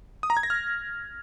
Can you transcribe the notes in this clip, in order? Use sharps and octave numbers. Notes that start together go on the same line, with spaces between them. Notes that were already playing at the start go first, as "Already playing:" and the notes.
D#6
A#5
G#6
A#6
F6